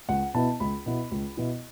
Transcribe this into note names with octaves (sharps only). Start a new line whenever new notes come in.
C#2 F#5
B2 B3 E4 A5
C#2 B5
B2 B3 E4
C#2
B2 B3 E4